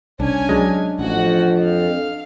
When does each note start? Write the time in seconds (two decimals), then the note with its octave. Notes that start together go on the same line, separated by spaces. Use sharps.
0.20 C2 C#4 D4 G#5
0.49 F#3 G#3 D4 D#5
0.99 A1 F2 F#4 F#5
1.63 F5